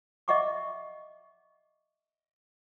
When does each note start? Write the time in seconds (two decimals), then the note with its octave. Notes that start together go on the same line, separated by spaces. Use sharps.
0.28 D#5 E5 F#5 C#6 D6